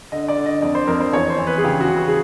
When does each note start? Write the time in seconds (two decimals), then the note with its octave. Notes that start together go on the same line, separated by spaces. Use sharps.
0.12 D3 D#5
0.28 D5
0.37 D3
0.46 D#5
0.62 F2 D5
0.75 C5
0.87 F2 A#4
1.00 C5
1.13 E2 C#5
1.30 C5
1.38 E3
1.47 B4
1.58 G#4
1.64 C#3 G4
1.80 F#4
1.89 C#3
1.97 F#4
2.08 G#4